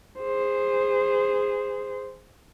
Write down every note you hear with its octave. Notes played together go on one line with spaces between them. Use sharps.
G#4 C5